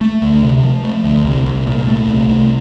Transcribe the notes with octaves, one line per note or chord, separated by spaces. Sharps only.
A3
D2
C3
F3
A3
D2
C2
C2
A#2
A3
C2
C2